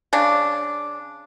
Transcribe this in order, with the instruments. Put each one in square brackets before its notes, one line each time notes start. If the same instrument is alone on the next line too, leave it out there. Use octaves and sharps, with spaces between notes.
[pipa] C#3 D4